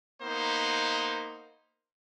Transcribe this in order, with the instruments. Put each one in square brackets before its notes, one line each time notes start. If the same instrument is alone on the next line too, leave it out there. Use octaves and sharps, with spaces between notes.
[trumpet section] A#3 B3 D#4 C5